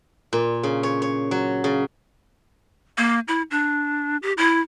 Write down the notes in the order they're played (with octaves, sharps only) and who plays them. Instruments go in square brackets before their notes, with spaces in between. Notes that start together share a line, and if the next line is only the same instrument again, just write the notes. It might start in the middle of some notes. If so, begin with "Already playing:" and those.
[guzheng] A#2
C#3
C#5
C#5
F#3
C#3
[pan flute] A#3
E4
D4
G4
E4